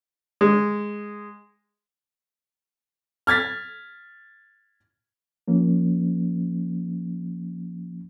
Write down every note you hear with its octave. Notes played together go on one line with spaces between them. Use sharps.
G#3
F6 G#6 A6 B6
F3 A#3 C#4